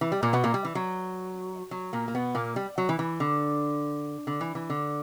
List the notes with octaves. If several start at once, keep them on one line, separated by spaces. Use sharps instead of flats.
E3
G3
A#2 A#3
B2 B3
A#2 A#3
G3
E3
F#3
F#3
A#2 A#3
A#3
B2 B3
A#2 A#3
G3
F#3
E3
E3
D3
D3
E3
E3
D3